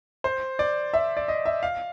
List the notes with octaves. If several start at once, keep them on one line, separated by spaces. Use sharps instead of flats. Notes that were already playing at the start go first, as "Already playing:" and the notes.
C5
D5
E5
D5
D#5
E5
F5